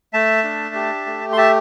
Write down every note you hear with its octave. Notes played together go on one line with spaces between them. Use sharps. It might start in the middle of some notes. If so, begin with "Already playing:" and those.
A3 E5 A5
D4
G4
A3
C6
G4 E5 A5